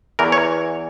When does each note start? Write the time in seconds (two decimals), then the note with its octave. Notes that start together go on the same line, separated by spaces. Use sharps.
0.19 E2 E3 A#4
0.32 C#5